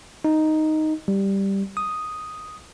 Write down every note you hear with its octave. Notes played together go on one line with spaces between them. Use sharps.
D#4
G3
D#6